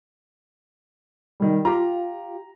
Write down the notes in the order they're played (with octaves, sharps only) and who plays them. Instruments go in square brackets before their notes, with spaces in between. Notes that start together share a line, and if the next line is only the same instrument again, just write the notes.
[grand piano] D#3 G3
[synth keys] F4 G4 [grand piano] A#5